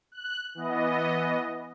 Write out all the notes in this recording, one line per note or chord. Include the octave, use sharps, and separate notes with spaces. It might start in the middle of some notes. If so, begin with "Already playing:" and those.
F#6
E3 B3 D#5